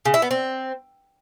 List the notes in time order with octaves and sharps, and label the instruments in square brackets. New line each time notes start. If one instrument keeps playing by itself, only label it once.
[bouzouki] C#3
E4
B3
C4